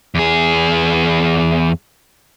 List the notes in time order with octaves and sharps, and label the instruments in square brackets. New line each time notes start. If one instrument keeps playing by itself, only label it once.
[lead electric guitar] E2 G#4